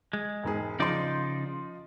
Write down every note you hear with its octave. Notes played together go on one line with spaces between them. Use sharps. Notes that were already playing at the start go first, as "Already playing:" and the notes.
G#3
E1 G#2 G#4
C#3 F3 D#4 D5 D#5 C6